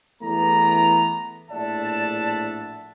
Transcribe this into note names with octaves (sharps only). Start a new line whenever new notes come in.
E2 E3 A3 B3 D5 A#5
A#1 A2 D5 E5 F#5 A5